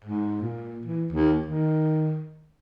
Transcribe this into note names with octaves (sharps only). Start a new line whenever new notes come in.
G#2
A#2
E3
D#2
D#3